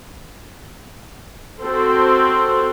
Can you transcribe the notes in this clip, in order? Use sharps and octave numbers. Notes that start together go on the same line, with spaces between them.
C4 F#4 A4 C5